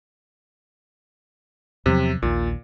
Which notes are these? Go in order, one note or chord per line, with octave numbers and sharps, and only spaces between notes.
E2 C3 F3 F#3
A#1 D#2 A#2